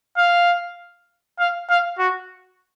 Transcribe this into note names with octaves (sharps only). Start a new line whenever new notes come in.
F5
F5
F5
F#4